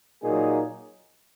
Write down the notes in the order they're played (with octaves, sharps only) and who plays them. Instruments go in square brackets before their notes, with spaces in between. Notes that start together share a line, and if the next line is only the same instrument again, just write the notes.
[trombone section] A#2 F#3 A#3 D#4 G#4